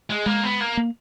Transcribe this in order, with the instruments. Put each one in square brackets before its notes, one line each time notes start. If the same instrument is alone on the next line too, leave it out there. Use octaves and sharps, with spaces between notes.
[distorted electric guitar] G#3
[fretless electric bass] G#3 [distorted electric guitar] A#3
[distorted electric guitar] B3
A#3
[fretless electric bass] A#3